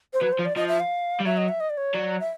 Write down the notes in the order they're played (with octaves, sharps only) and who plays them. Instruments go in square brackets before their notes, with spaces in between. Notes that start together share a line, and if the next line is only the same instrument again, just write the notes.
[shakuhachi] C5
[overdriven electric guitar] F#3 [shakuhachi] B4
[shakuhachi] C5
[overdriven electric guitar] F3
[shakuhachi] D5
[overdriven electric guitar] F3 [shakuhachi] D#5
[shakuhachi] E5
F5
[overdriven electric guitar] G3
[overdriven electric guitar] F#3 [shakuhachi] E5
[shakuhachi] D#5
E5
D#5
D5
C#5
[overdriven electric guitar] F#3 [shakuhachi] D5
[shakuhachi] E5